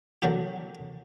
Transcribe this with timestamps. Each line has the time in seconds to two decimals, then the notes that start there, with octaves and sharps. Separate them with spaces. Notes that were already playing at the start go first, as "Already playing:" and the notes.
0.22 D3 F#3 A#3 F#4 G4